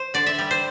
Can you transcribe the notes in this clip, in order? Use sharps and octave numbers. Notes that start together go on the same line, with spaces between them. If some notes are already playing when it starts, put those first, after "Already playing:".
Already playing: C5
D3 D5
E5
G3
C5